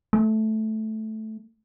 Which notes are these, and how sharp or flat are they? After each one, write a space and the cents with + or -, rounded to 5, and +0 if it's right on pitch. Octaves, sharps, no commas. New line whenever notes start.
A3 -10